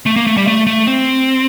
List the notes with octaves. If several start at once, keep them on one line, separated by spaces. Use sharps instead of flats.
A3
A#3
A3
G3
A3
A3
C4